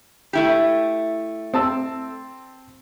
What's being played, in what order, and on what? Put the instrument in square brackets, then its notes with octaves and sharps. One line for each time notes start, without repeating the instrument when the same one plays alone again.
[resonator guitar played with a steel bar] A3 E4 G4
[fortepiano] C4 A5 E6